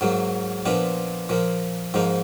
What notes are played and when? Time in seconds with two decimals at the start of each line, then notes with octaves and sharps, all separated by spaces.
0.01 G#2 F#3 A#3
0.66 A#2 F3 B3 D4 F4
1.29 A#2 F3 A#3
1.94 G#2 F3 A#3 D#4